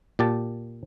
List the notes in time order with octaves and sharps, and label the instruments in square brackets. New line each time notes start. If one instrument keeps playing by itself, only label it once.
[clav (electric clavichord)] A#2 G4 A5